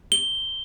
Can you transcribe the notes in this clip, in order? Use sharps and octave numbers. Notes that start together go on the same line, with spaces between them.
G7